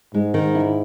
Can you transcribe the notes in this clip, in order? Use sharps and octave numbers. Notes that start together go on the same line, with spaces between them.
G#2 G#3
D#3
E4